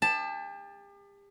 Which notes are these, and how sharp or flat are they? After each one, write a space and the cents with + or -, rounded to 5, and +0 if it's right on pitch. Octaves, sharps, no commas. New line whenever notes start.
G4 +40 A5 +0